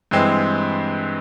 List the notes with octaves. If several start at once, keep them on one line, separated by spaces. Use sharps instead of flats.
G2 E3 G#3 C4